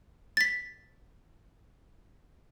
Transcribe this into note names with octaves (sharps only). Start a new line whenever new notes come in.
A6 B6